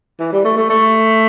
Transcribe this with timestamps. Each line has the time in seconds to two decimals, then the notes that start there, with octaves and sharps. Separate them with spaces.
0.19 E3
0.32 G3
0.45 A3
0.57 A3
0.70 A3